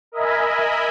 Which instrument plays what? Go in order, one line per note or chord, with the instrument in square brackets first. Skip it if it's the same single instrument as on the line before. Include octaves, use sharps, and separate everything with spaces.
[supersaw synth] A#4 D#5 E5 G#5 B5